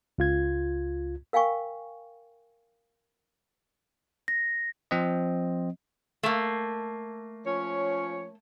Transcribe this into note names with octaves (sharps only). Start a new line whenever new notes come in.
C#2 F4 G#6
A#4 F5 G5 G#5 C#6
A#6
F3 C4 D#5
A3 A#3
F3 C#4 C#5